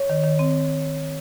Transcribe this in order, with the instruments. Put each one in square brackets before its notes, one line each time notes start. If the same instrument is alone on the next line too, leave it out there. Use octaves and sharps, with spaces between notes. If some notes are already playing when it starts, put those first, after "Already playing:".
Already playing: [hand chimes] C#5
[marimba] D#3
D#3
C4